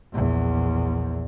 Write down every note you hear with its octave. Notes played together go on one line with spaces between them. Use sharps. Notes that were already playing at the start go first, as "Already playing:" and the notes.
A#1 E2